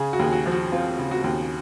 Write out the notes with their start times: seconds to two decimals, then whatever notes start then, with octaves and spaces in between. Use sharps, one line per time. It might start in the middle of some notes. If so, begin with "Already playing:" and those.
Already playing: C#3 G#4
0.13 F#4
0.19 D#2 G#4
0.32 F#4
0.46 F3
0.52 F#4
0.72 C4 F4
0.99 C#3
1.11 F#4
1.24 D#2